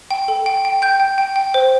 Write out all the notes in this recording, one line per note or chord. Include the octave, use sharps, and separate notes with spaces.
G5
A4
G5
G5
G5 G6
G5
G5
G5
C5